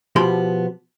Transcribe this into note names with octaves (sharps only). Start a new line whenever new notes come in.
B2 F3 B3 G4 B5 C6